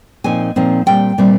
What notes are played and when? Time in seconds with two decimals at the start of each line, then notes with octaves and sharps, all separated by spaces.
0.24 A#2 F3 C4 D#4 G#5
0.56 A#2 F3 C4 D#4
0.86 A#2 G3 C4 G5
1.18 A#2 G3 C4